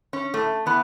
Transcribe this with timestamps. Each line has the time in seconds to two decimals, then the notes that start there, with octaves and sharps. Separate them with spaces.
0.13 C#4
0.34 A2 A3
0.66 E3 B3